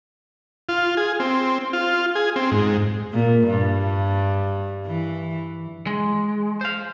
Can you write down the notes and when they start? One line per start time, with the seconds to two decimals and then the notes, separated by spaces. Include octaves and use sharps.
0.69 F4
0.97 G#4
1.20 C4
1.73 F4
2.15 G#4
2.36 C4
2.51 G#2
3.13 A#2
3.47 G2
4.86 E3
5.87 G#3
6.61 C5 F5